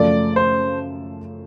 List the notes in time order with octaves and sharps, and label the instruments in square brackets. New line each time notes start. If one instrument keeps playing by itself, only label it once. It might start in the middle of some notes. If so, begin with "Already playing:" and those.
Already playing: [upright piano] F#2 C#3 F3 A3 [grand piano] D5
[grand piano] C5